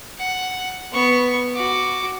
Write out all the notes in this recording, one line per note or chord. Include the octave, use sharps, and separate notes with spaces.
F#5
B3 C#6
F#4 D6